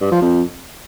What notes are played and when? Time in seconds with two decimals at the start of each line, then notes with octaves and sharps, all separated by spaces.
0.01 G2
0.11 F3
0.22 F2